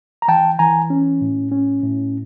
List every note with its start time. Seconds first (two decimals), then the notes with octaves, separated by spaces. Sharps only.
0.22 A#5
0.28 E3 G5 A5
0.59 E3 G#5 A#5
0.90 C#4
1.21 A2
1.52 C#4
1.83 A2